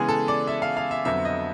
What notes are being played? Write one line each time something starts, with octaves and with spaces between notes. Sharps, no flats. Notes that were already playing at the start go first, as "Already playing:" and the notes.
Already playing: C#3 E3 G#3 B3 G#4
A4
D5
E5
F5
F5
E5
F2 D3 F#3 B3 E5
D#5